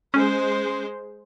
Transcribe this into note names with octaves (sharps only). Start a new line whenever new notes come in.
G#3 C#4 C5